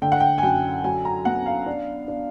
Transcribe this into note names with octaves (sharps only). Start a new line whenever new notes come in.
D3 G5
F#5
G5
G#5
F#2 G5
F#3 G#5
A#5
B3 F#5
F5
D4
D4